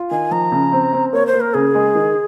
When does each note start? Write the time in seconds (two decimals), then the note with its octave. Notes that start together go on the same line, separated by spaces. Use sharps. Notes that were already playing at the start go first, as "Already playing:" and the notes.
Already playing: F4
0.11 D#3 G#5
0.31 F3 A#5
0.52 C#3
0.72 C4
0.93 C4
1.13 A#3 C#5
1.27 C5
1.34 A#3
1.41 A#4
1.54 C#3 G#4
1.75 G#3
1.95 D#3